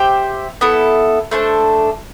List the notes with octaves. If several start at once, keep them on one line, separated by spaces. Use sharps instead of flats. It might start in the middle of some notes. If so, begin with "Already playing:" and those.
Already playing: G4 C5 E5 G5
B3 E4 A4
A3 D4 A4 C5